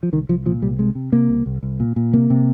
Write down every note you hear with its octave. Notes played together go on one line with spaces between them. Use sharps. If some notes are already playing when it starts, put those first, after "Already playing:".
F3
C2 D#3
C2 F3
A#2 F3
C2 G3
C3 G#3
C3
C3 A#3
C2
C2
C2
A#2
A#2
C3 A#3
C3